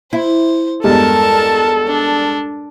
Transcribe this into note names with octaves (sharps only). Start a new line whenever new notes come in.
E4 C5
E2 G2 G#3 A4 A#4 A5
D4